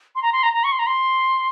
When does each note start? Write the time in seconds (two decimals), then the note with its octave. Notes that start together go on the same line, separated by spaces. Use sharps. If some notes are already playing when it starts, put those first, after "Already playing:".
0.16 C6
0.22 A#5
0.33 C6
0.43 A#5
0.53 A#5
0.64 C#6
0.72 C6
0.79 A#5
0.87 C6